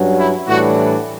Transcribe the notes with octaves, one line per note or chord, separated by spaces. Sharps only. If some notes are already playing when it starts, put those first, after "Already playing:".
Already playing: G2 F#3 C#4
E4
A2 E3 G3 D4 F#4